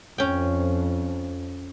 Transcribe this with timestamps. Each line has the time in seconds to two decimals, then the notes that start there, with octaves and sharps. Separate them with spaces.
0.18 F2 C#4 G5